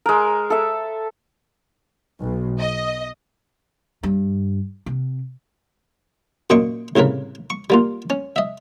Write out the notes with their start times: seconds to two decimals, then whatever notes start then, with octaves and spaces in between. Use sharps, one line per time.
0.06 G#3 A#4
0.50 A4 E5
2.21 B1
2.59 D#5
4.03 G2
4.86 C3
6.50 F#2 A#2 D#5 G5 C6 C#6
6.96 C2 A2 C#3 A#4 B4
7.50 C#6
7.70 G3 A#3 F4
8.10 C#4
8.36 D#5 E5